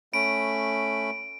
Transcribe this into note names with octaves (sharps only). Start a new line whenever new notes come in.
A3 C#4 B5 D7